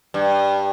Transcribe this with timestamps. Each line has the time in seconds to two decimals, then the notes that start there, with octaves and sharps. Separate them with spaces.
0.14 G2